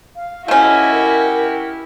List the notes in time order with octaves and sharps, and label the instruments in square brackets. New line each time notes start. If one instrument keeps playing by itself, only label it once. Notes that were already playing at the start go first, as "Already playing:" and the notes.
[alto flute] F5
[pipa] A3 C#4 [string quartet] E4 F#4 G4 [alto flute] D#5
[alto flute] A#4